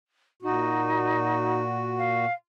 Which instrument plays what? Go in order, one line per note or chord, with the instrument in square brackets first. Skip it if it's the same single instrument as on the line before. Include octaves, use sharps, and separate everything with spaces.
[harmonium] A#2 F#4 [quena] D#4
[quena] F5